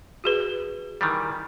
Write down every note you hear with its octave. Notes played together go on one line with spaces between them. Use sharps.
F#4 G#4 B4
D#3 E3 G3